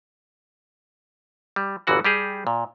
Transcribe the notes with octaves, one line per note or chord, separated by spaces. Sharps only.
G3
G1 A#2 E3 F#4 F#5
G3 G4 G#4
A#2